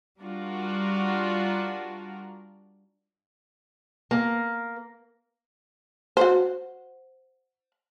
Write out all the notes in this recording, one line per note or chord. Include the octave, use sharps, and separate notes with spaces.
G3 D4 F4 F#4 A#4
A#3
F#4 C5